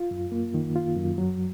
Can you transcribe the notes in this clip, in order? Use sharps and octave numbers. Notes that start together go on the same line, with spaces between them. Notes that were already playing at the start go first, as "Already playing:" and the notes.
Already playing: F4
F#2
A#3
D#3
F4
F#2
F#3